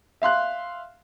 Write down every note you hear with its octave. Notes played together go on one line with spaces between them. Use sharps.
E5 F5 C6 F#6